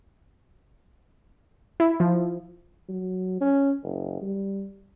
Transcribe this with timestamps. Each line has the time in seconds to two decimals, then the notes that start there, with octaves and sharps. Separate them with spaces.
1.80 E4
2.00 F3
2.88 F#3
3.41 C#4
3.83 F#1
4.22 G3